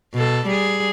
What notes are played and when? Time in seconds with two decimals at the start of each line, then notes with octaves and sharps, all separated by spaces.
0.14 B2 A4
0.47 G3 G#4